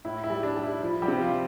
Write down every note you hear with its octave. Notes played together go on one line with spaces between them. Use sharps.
A2 E4
E4
G3
D4
G3
E4
F3 E4
G3 G4
C3
F3 F4